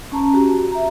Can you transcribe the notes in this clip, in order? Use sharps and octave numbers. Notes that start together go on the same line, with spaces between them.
C#4 A5 A#5
F#4 G4
E5 A#5